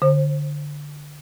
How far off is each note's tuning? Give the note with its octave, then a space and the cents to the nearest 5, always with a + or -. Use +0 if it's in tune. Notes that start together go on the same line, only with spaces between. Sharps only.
D3 +0 C5 +30